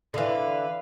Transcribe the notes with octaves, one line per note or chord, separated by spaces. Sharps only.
D3 E3 B4 F5